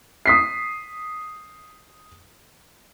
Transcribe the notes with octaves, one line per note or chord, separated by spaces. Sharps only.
D#6 B6 C7